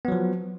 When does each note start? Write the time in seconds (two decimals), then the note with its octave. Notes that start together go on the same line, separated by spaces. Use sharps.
0.05 B3
0.08 F#3
0.12 F3